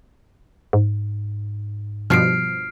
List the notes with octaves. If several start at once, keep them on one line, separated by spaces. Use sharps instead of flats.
G#2
G2 B2 F3 F6 C7 D7